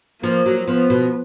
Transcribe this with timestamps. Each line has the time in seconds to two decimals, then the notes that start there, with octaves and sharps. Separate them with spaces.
0.23 F3 A#3
0.46 F#3
0.68 F3 B3
0.90 B2